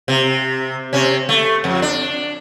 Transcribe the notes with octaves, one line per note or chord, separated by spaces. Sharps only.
C3
C3 C#4
A3
F2
D4